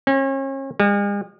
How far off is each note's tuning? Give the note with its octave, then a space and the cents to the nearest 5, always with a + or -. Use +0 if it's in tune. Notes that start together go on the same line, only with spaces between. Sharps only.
C#4 -40
G#3 -45